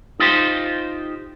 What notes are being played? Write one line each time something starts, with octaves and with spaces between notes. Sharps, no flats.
D#4 F4 G4 C5